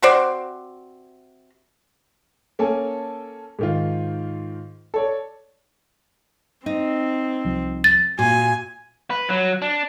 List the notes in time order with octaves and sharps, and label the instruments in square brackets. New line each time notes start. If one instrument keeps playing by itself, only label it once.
[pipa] C3 F#4 C5 D5
[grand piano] A#3 C#4 A4 G#5
G#2 D#3 F4
A4 C#5 D5
[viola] C4 [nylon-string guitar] D#4
[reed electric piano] C2 F3
[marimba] A6
[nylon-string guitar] A#2 [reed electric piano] F#4 [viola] G#5
[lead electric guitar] B4
F#3
D4